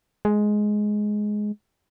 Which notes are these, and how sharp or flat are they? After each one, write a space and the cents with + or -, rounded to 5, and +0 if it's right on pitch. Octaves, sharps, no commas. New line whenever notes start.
G#3 +10